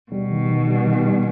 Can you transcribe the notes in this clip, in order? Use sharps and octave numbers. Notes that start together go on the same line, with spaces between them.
B2 G3
D#3
D#3
G3
D#3
G3